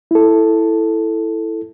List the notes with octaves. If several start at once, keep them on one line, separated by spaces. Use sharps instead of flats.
E4 A4